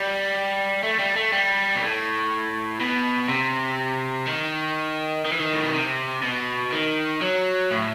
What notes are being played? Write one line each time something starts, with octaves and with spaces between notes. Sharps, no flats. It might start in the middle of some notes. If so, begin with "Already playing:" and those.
Already playing: G3
A3
G3
A3
G3
B2
A2
B2
C3
D#3
D#3
E3
D#3
A2
B2
C3
B2
D#3
F#3
A2